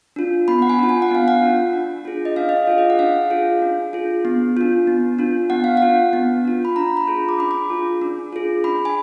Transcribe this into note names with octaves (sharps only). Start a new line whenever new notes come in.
D4 F4
B3 B5
F#5
G#5
D4 F4
G#5
F#5
B3 F5
F#5
D4 F4
D4
F4 G#4
D#5
D4 F5
D#5
F5
F4 G#4
D#5
F#5
D4 F5
F4 G#4
D4
F4 G#4
B3
D4 F4
B3
D4 F4
B3 F#5
F5
F#5
D4 F4
B3
D4 F4
B5
D4 A#5
B5
F4 G#4
D6
D4 B5
D6
F4 G#4
D4
F4 G#4
D4 B5
G#5